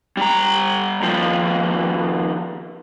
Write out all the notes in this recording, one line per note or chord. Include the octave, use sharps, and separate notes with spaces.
G3 A#5
D#2 F3